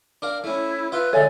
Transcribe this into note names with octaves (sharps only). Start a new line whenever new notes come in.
D4 A#4 F5
A3 C#4 E4
F4 B4 E5
D3 G#3 A4 C#5 D5 E5 G#5